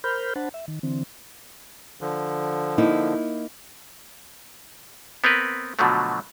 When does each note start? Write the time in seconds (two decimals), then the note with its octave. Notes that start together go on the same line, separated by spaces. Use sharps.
0.04 A#4 C5 B5 F6 G6
0.36 D4 C5 F#5 A5 B5
0.54 E5
0.68 D#3
0.83 D3 E3 C4
2.01 D3 F3
2.78 A#3 D#4 E4
5.24 B3 C4 A#4 B4
5.79 B2 D3 F3 F#3 A3